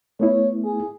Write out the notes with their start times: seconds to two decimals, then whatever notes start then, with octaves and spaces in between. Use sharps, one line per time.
0.20 A3 B3 E4 C#5
0.64 G#4